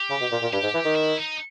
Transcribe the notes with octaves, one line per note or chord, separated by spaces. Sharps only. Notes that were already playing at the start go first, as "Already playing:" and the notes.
Already playing: G4
C#3
B2
A#2
A#2
G2 G4
G#2
E3
D#3
E4
D#4